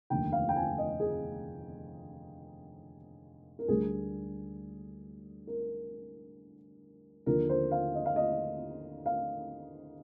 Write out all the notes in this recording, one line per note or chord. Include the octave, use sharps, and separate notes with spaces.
F1 D#2 D3 G5
F5
G5
G#5
D#5
G#4
A#4
D2 D3 G3 G#4
A#4
D#2 D3 F3 A#4
C5
F5
D#5
F5
D#5
F5